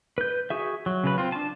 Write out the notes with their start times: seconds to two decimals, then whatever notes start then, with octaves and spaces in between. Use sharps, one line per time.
0.18 B4 G6
0.50 F#4 G#4 E5
0.86 F#3
1.04 C#3 F#3 B4
1.18 C4 F4
1.32 D4 A5